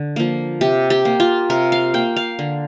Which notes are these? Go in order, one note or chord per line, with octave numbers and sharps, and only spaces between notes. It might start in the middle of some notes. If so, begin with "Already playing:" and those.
Already playing: D3
F3 A#3
C3 G4
G4
A#3
F4
C3 A#4
F5
A#3 G5
F5
D3